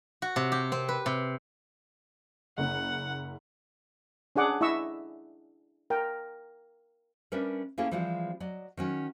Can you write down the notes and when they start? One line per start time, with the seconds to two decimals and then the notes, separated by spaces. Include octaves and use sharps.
0.22 F#4
0.36 C3
0.52 G4
0.72 C4
0.89 B4
1.06 C3
2.58 F#1 F#5
4.36 C#4 D4 G#4 F#5 D6
4.61 E4 D#5 E5 C#6 E6
5.90 A#4 G5
7.32 G3 C#4 D4 A#4 B4 E5
7.78 A#3 C#4 E4 G#4 A4
7.91 E3 F3 G3 G#3 C4 F4
8.40 F#3 D5 D#5
8.77 D#3 F#3 C#4